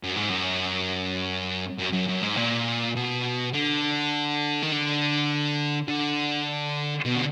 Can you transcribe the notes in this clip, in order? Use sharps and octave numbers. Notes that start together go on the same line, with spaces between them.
F#2
G#2
F#2
F#2
F#2
F#2
G#2
A#2
B2
D3
D#3
D3
D3
B2
D3